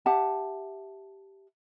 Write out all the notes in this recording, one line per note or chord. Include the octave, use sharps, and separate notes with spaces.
G4 E5 F#5 A5